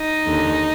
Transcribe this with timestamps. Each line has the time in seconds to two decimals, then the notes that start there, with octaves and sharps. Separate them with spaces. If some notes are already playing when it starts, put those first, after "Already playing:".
Already playing: D#4
0.26 D#2 D3